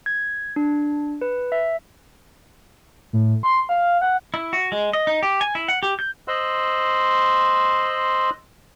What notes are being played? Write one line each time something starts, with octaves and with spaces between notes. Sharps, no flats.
G#6
D4
B4
E5
A2
C6
F5
F#5
E4
F#4
G#3
D#5
D#4
G4
G#5
E4
F#5
G4
G6
C5 D#5 C6 E6 F#6